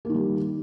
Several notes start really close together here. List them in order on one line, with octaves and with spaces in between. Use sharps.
A#3 D#3 G3